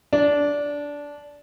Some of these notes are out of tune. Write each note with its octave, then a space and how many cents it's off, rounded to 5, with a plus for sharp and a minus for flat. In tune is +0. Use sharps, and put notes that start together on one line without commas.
D4 -15